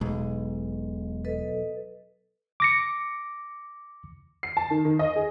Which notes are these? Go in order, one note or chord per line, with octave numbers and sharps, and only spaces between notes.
E1 B1 G#3
A4 B4 D#5
D6 A#6 C#7
C7
A5
D#3
D#3
D#5
G#4